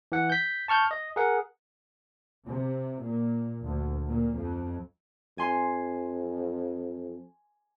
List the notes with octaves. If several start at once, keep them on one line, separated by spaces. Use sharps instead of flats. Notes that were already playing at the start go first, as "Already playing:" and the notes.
E3 F#5
G6 B6
A5 C#6 F6 G6
D#5
G#4 A#4 F#5
C3
A#2
D2
A#2
F2
F2 G#5 C6